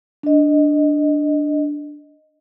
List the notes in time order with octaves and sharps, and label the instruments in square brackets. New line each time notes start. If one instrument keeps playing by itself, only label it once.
[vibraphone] D4 D#5